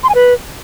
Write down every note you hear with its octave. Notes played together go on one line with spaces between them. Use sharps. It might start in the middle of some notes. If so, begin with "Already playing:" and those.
C6
G#5
B4